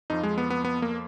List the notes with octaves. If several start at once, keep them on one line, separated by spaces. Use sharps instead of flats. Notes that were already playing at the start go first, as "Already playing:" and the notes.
F2 F3 D#4
G#3
B3
B3
B3
A#3